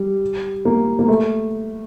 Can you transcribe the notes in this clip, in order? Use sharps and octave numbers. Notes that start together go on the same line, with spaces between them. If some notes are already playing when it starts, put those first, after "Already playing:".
Already playing: G3
A#3
A#3
A3